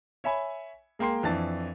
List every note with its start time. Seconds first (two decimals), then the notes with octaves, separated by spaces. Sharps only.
0.24 C#5 E5 G#5 B5
0.99 G#3 A#3 G5 C6 C7
1.23 F2 E3 D4 A5 A6